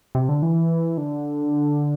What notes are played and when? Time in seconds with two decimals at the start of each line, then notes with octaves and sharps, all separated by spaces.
0.15 C3
0.29 D3
0.42 E3
0.98 D3